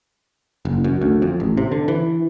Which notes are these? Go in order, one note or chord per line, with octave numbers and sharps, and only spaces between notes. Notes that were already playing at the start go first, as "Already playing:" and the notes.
F#1
F#2
D2
F2
A1
C3
D3
E3